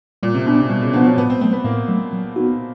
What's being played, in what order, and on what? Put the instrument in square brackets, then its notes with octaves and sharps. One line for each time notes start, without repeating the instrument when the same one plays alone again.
[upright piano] A#2 [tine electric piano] G3
[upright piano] C3
[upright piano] B2 [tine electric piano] B3 D4
[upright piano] C3
[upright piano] B2 [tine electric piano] G3
[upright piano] C#3
[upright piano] F3 [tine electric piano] B3 D4
[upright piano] F#3
[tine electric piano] A2 [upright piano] B3
[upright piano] C4
[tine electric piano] F#3 A3 [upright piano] C4
[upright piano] B3
[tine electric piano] A2 [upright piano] A#3
[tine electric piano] F#3 A3
F#3
B3 D#4 F#4